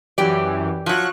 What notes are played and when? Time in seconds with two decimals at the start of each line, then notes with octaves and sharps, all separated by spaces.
0.18 F#2 E3 G4 D5
0.86 F3 F#3 C#6 F#6